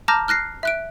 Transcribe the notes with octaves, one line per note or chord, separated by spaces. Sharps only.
A5 A#5 D6 F6 G6 A#6
F6 F#6 A#6 C7
E5 F#6 D7